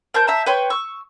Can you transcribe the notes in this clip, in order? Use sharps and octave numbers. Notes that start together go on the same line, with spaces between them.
A#4 C5 A5 G6
C5 E5 A5 A#5
B4 C#5 G5 C6
C#6 E6